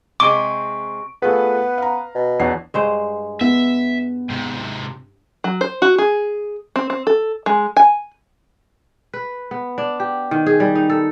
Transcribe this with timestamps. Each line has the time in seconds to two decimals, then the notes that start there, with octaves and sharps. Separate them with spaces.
0.20 C3 G#3 C4 C#6 D6 D7
1.22 A3 B3 F4 G#4 B4
1.78 F5 A#5
2.15 B2
2.40 E2 D4 C#5 F#5 C7
2.74 G2 G#3 C5
3.41 B3 E5
4.30 G#2 C3
5.44 F#3
5.61 C5
5.82 F#4
5.98 G#4
6.76 C4
6.90 C4
7.07 A4
7.46 G#3
7.77 G#5
9.14 B4
9.51 B3
9.78 D4
10.00 G4
10.31 D#3
10.46 G#4
10.60 G3
10.75 D#4
10.90 A4